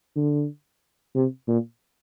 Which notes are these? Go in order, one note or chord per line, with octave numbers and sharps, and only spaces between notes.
D3
C3
A#2